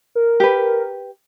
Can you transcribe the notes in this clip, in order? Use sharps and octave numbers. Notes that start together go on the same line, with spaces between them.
A#4
G4 B4